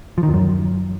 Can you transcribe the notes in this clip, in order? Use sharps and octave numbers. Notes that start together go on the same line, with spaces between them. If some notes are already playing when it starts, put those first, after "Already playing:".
F3
D#3
E2
F#2